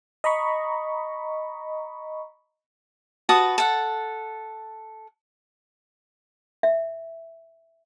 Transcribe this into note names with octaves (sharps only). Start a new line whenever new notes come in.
D#5 A#5 B5 C#6
F#4 B4 A5 D#6
A4 F#5
E5